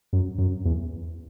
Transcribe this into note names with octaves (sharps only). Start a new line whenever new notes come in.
F#2
F#2
E2